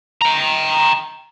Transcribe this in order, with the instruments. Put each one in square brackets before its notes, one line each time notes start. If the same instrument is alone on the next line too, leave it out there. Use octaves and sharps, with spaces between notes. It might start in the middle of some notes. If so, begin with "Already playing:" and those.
[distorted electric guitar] G5 A#5